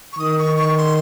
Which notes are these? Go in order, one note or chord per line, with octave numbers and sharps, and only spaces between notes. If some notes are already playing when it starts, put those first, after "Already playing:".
C#6
D#3 D#6
C#6
C#6
C6